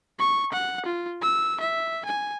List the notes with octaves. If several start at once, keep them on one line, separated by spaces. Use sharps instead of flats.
C#6
F#5
F4
E6
E5
G#5